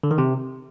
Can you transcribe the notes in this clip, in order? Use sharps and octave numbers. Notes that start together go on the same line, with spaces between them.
D3
D#3
C3